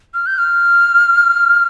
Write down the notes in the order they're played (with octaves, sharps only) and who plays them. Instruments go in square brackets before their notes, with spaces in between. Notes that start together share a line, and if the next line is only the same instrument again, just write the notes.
[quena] F6
G6
F6